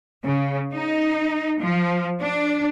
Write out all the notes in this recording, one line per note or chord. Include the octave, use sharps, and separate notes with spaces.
C#3
D#4
F3
D4